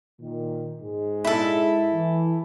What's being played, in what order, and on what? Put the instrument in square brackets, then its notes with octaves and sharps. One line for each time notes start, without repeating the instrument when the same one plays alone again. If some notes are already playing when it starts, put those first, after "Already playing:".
[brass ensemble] A#2 D#3
G#2 G#3
[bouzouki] E4 A4
[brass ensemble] E3